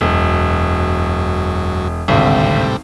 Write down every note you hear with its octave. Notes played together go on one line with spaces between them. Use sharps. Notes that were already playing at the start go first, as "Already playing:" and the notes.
E1 F#2
G#1 D2 A2 C3 G3